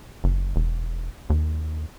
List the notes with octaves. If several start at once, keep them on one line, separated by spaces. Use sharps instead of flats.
F#1
E1
D#2